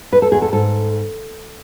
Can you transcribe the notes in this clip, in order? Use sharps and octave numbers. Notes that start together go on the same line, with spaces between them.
E2 B4
A4
E2 G#4
A4
G#2 A4